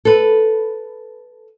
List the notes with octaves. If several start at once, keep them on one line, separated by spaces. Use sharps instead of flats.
A4 B4